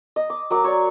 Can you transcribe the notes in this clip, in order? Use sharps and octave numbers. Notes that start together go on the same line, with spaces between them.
D#5
D6
F#3 A#4 D6
C#5 D5